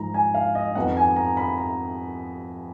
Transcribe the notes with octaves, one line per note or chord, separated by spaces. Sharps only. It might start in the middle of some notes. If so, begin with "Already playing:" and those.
Already playing: G#2 F3 G#3 D#4 A#5
G#5
F5
D#5
F2 F3 B3 D#4 F#5
G#5
A#5
B5
A#5